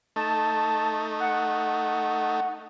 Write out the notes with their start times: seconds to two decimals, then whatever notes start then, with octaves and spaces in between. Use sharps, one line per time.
0.16 A3 D#4 A5
1.20 F#5